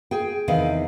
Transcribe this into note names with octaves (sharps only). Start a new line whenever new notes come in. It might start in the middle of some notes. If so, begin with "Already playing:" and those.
G#4 G5
E2 C3 D#3 D#4 B4 F5